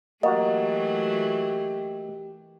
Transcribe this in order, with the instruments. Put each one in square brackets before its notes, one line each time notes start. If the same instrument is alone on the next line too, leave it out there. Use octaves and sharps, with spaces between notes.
[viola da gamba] E3 F#3 A3 [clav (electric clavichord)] A#3 F#4 F#5 [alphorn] G4 [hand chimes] D#5